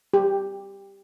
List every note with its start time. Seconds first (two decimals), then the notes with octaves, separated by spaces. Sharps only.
0.13 G4